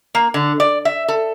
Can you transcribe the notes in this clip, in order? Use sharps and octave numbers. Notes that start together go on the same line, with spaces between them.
A#3
D3
D5
E5
A4